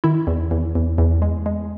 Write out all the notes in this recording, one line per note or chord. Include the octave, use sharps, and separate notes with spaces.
D#3 E4
E2
E2
E2
E2
G#3
G#3